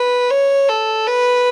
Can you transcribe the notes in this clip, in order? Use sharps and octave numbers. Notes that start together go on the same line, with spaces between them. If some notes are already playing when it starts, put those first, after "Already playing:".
Already playing: B4
C#5
A4
B4